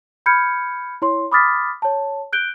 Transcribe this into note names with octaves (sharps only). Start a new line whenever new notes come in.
B5 F6 G6 G#6 C#7
E4 C#5 C6
B5 D6 D#6 F6 A6 B6
C#5 A5
F#6 G6 D7 G7